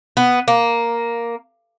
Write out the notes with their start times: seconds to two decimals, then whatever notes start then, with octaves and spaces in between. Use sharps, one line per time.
0.17 B3
0.48 A#3